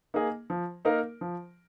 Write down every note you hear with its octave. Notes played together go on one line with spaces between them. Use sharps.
A#3 D#4 G#4 D#5
F3
A#3 D#4 A#4 F5
F3